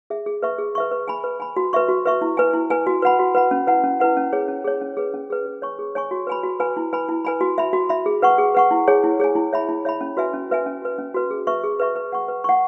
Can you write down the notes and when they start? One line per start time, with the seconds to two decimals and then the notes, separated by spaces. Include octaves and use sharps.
0.10 G#4 E5
0.26 G#4
0.42 B4 E5 C#6
0.58 G#4
0.75 B4 E5 C#6
0.91 B4
1.08 G#5 B5
1.24 B4
1.40 G#5 B5
1.56 F#4
1.73 B4 E5 C#6
1.89 F#4
2.05 B4 E5 C#6
2.21 E4
2.37 B4 G#5
2.53 E4
2.70 B4 G#5
2.87 F#4
3.02 B4 F#5 B5
3.19 F#4
3.35 B4 F#5 B5
3.51 C#4
3.67 E4 B4 F#5
3.84 C#4
4.00 E4 B4 F#5
4.17 C#4
4.33 G#4 C#5
4.48 C#4
4.64 G#4 C#5
4.81 C#4
4.97 G#4 B4
5.14 C#4
5.30 G#4 B4
5.46 G#4
5.62 C#5 G#5 C#6
5.79 G#4
5.95 C#5 G#5 C#6
6.11 F#4
6.27 B4 G#5 B5
6.43 F#4
6.60 B4 G#5 B5
6.77 E4
6.93 B4 G#5 B5
7.09 E4
7.25 B4 G#5 B5
7.41 F#4
7.58 E5 B5
7.73 F#4
7.89 E5 B5
8.06 G#4
8.22 B4 F#5 C#6
8.38 G#4
8.54 B4 F#5 C#6
8.71 E4
8.87 G#4 C#5 G#5
9.04 E4
9.20 G#4 C#5 G#5
9.35 E4
9.53 C#5 E5 B5
9.69 E4
9.85 C#5 E5 B5
10.01 C#4
10.17 F#4 B4 E5 G#5
10.33 C#4
10.50 F#4 B4 E5 G#5
10.66 C#4
10.82 F#4 B4
10.98 C#4
11.14 F#4 B4
11.31 G#4
11.47 B4 E5 C#6
11.63 G#4
11.79 B4 E5 C#6
11.96 B4
12.12 F#5 C#6
12.28 B4
12.44 F#5 C#6